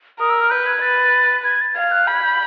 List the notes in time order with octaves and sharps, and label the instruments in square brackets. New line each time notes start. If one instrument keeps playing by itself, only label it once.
[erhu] A#4 [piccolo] D#6
[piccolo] E6
F6
[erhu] B4 [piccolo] G6
[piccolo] G#6
[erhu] B4 [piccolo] A6
[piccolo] G#6
A6
[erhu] F5 [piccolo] G#6
[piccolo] F#6
[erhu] B5 [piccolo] G6
[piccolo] G#6
G6